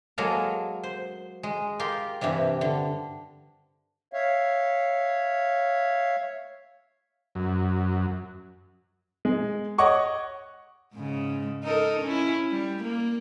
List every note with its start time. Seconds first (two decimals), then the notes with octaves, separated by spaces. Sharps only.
0.18 F#3 G#3 A#3 A4 A#4
0.84 C5
1.43 G#3
1.79 F4 G4 A#4 C6
2.21 G2 C3 E3 G3
2.61 D3
4.13 C#5 E5 F5
7.35 F#2
9.25 G#3
9.78 C#5 D#5 F#5 C#6 D6
10.95 G#2 C#3
11.64 D#4 A4 A#4
12.02 C#4 E4
12.51 G3
12.84 A#3